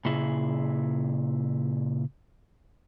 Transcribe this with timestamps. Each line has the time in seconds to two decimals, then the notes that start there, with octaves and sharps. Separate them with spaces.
0.05 A#2 C#3 E4 G#4